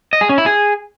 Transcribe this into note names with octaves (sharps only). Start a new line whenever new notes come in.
D#5
G#4
C#4
E4
G#4